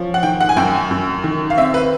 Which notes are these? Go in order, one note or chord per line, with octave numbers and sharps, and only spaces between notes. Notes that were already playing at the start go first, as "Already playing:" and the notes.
Already playing: F3 C#4
F#5
D#3 G5
F#5
G#5
F#2 G5
F#2
D#3
F5
C4 E5
B4